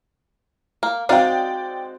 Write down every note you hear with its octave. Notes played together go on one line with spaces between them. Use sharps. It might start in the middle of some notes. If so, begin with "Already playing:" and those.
A#3
G#3 C4 D#4 F#4 D5 F5 G5